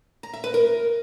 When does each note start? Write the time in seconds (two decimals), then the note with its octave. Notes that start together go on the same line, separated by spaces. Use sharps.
0.23 A#5
0.33 E5
0.44 B4
0.54 A#4